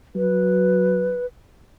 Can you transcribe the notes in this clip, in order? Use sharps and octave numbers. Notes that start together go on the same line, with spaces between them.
F#3 B4